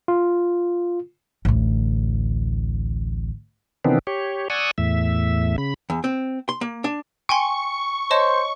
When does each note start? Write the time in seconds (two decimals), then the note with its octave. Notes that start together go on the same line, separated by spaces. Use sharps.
0.08 F4
1.45 A1 D2
3.85 C3 D#3 E3 B3 C4 D4
4.07 G4 C#5
4.50 D5 F#5 G#5 C#6 D#6 E6
4.78 E2 A2 E5
5.58 C#3 B5
5.90 E2
6.04 C4
6.49 C6
6.61 A#3
6.84 D4
7.29 G5 G#5 C6 C#6
8.11 C5 C#5 D#5 A5